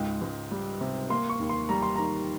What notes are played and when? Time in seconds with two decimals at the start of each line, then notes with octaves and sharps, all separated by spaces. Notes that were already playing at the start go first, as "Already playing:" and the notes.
Already playing: C#2 G#2 G5
0.21 C#2
0.51 G3
0.81 C3
1.10 A#3 C6
1.29 C#6
1.40 D#2
1.49 C6
1.69 G3 A#5
1.82 C6
1.96 D#3 A#5